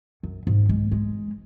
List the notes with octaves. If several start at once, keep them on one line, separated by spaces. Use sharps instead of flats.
F#2
G#2
G#3
G#3